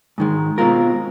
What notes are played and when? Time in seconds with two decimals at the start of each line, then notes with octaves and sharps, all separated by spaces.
0.18 G#2 D#3 G#3
0.58 B2 G#3 C4 F4 A#4